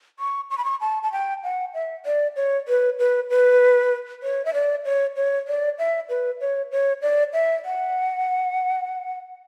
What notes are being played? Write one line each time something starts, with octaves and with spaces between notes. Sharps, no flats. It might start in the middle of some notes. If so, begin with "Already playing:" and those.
C#6
C#6
B5
C#6
A5
A5
G5
F#5
E5
D5
C#5
B4
B4
B4
C#5
E5
D5
C#5
C#5
D5
E5
B4
C#5
C#5
D5
E5
F#5